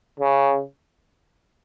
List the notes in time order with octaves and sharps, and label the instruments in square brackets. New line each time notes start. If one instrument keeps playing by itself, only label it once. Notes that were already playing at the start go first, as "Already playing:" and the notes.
[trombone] C#3